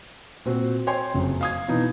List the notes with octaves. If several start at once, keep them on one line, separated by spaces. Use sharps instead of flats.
A#2 C4 F#4
C#5 G5 G#5 C6
F#1 F2 F#3
F5 D#6 G#6
B2 E3 D#4 E4